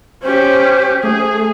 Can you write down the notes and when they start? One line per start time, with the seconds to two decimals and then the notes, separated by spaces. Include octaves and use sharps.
0.23 C#4 G4 C5
1.04 A3 G#4